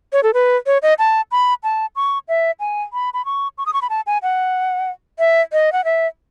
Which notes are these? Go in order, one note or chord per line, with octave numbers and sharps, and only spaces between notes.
C#5
A4
B4
C#5
D#5
A5
B5
A5
C#6
E5
G#5
B5
B5
C#6
C#6
D#6
C#6
B5
A5
G#5
F#5
E5
D#5
F#5
E5